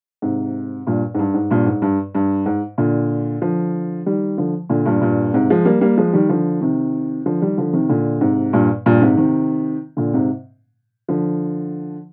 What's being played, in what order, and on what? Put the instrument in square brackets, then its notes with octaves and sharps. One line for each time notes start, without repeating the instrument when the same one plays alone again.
[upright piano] G#2 C3
G2 A#2
G#2
G2
G#2
G2 A#2
G#2
G2
G2
G#2
A#2 D3
D3 F3
D#3 G3
D3 F3
A#2 D3
G2 A#2
G2 A#2
G#2 C3
F3 G#3
G3 A#3
G3 A#3
F3 G#3
D#3 G3
D3 F3
C3 D#3
D3 F3
D#3 G3
D3 F3
C3 D#3
A#2 D3
G#2 C3
G2 A#2
G2 A#2
G#2 C3
C3 D#3
A#2 D3
G#2 C3
D3 F3